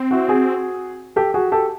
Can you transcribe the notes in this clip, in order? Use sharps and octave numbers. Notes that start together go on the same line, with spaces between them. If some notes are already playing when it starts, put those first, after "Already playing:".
Already playing: C4
E4 F#4
F#4 G#4
G4 A4
F#4 G#4
G4 A4